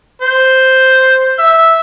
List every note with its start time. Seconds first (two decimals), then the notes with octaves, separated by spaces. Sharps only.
0.22 C5
1.39 E5